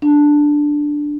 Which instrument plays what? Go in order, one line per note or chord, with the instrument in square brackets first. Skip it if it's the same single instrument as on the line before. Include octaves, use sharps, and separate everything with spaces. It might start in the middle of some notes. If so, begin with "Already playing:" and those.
[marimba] D4